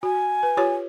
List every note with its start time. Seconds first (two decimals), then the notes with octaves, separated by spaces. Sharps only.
0.03 F#4 G#5
0.43 B4
0.57 F4 G4 C#5